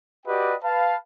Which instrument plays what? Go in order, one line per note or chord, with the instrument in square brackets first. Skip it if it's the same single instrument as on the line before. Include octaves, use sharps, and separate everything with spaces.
[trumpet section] F#4 G4 B4 D5 D#5 G5
B4 F5 A5